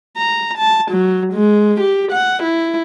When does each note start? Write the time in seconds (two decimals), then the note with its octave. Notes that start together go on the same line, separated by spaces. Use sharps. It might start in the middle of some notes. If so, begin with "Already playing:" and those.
0.17 A#5
0.58 A5
0.91 F#3
1.33 G#3
1.80 G4
2.12 F#5
2.43 E4